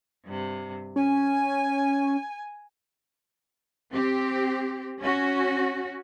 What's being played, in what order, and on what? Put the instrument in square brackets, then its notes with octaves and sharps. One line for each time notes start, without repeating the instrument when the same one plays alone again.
[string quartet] G2 C3
[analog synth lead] C#4 [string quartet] G#5
[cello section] C4 G4
C#4 F#4